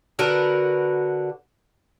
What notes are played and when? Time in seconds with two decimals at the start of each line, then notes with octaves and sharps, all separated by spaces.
0.19 D3 F#4 A#4 B4